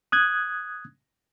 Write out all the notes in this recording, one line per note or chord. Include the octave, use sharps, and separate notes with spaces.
D#6 F#6 G#6